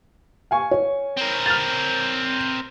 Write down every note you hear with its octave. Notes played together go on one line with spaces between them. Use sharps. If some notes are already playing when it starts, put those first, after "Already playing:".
F5 G#5 C#6
C#5
C4 A#4
F6 A6